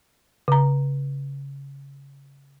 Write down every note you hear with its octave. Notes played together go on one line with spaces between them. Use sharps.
C#3 A#5